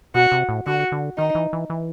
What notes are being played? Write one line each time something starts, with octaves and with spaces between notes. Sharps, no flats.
B2 F#4
C3
A2
D3 F#4
D3
D#3 D#4
E3
E3
E3